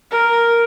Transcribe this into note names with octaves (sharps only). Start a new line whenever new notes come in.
A#4